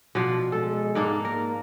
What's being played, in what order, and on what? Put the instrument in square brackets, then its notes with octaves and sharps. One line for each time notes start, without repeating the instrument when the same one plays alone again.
[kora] B2 F3 D4
[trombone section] G#3 [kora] A4
[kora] G#2 A#3 D4
[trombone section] A#3 [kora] A#4